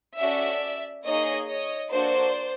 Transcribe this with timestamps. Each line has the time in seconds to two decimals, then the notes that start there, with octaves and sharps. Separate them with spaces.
0.19 C#4 F#4 A4 D5 E5
1.05 A#3 D#4 G#4 C#5 D#5
1.48 C#5 D#5
1.91 A#3 D4 F#4 A4 C5 D5